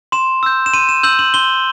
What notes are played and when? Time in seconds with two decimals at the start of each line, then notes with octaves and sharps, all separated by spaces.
0.12 C6 E7
0.43 E6 G6
0.66 E7
0.73 C6 D#7
0.89 E7
1.03 E6 G6 F#7
1.19 F#7
1.34 C6 G7